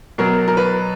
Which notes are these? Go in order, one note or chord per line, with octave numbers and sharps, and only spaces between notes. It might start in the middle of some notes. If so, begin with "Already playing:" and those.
B2 F#3 A#4
A#4
B4